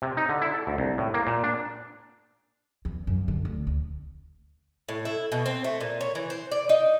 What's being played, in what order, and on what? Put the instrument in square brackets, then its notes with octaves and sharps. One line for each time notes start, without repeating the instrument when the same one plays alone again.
[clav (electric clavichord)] C3
D#4
D3
E4
A4
D2
C2
A2
A#3
A#2
D4
[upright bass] E2
F#2
D3
D2
D2
[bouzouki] A2
E4
B2
C4
A3
A#2
C#5
E3
C5
D5
D#4